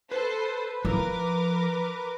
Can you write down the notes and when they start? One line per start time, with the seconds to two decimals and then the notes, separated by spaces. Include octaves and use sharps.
0.11 A4 B4 C5
0.85 F3 A#4 D6